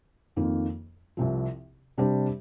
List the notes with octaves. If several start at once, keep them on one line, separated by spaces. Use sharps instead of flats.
F2 D#3 A#3 F4
C2 C3 F3
C3 G3 D4 G4 C5